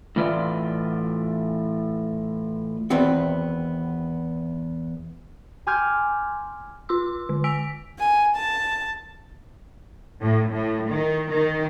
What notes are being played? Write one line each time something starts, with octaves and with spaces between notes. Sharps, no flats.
A2 E3 F4 B4 D5
E2 D#3 E3 B3 C4 F#4
G#5 C6 D6 F6 G6 G#6
F4 C6 E6
D3
G#5 E6 B6 D7
G#5
A5
A2
A2
D#3
D#3